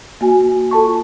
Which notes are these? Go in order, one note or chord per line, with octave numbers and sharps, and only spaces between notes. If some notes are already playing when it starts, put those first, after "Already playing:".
A#3 F#4 G#5
F4 A4 A5 C#6